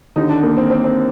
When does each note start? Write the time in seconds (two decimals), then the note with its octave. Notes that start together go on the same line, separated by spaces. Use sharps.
0.16 D#2 D3 D#4
0.29 D4
0.43 A#3
0.57 C4
0.70 C4
0.84 C4